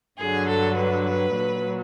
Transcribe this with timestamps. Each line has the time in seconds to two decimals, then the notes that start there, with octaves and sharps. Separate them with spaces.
0.19 G2 D3 F#3 G#4
0.48 A4
0.77 B4
1.06 B4
1.36 A#2 F#3